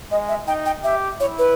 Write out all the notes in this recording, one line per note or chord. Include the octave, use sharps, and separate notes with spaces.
G#3 D#5
E5
D#4 G5
G5
G4 E5
E4 C#5
B4